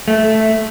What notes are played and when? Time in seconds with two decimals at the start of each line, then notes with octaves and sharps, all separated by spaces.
0.08 A3